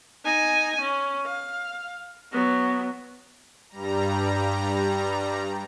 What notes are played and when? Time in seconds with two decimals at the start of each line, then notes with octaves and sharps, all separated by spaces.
0.25 D#4 G#5
0.81 C#4
1.26 F5
2.32 F#3 B3
3.70 G2 G3 A#5